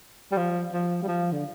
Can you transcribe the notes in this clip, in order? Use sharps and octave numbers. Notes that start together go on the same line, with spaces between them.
G3
F3
F3
G3
F3
D3